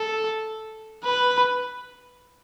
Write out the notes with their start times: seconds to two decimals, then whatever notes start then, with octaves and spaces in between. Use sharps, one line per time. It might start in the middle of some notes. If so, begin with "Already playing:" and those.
Already playing: A4
1.05 B4